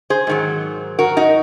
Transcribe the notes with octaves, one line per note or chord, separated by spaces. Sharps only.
G#4 C5
G#2 D#3 F#3
F#4 A#4
D#4 F#4